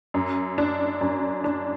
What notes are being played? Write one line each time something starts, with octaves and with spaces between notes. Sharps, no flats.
F#2
D4
F#2
D4